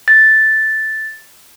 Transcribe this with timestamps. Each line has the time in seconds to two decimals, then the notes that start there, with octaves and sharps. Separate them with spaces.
0.08 A6